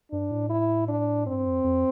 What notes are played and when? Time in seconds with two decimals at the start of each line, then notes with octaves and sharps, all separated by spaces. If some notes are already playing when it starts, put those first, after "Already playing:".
0.11 G2 D4
0.31 A2
0.50 E4
0.88 D4
1.27 G2 C4
1.46 F2
1.64 F2